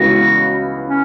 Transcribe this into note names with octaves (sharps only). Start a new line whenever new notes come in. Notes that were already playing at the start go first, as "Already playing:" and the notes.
Already playing: C#2 C#3 E3 B3 F#4
C#4